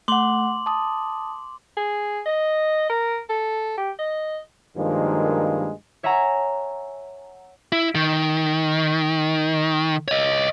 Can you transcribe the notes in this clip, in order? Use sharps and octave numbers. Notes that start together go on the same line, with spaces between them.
A3 F#5 C6 D6 F#7
A5 D#6
G#4
D#5
A#4
A4
G4
D#5
G2 D#3 F3 G#3 A#3
C#5 E5 F#5 G#5 A#5
E4
D#3
C#5 D#5